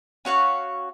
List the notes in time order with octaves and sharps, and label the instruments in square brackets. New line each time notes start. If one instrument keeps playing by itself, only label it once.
[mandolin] C#4 F#4 C#5 F5